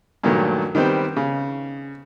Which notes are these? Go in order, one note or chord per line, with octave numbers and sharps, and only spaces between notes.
G2 A#2 D#3 F#3 A3
D#3 G3 B3 C4
C#3